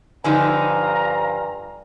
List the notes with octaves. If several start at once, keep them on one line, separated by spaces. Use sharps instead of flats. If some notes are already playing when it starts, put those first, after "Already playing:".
G2 D3 F3 D#4 F5 G#5 A#5